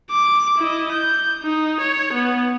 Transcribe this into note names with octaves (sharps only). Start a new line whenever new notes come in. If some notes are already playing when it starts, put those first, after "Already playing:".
D6
E4 D#5
G6
D#4
C#5
B3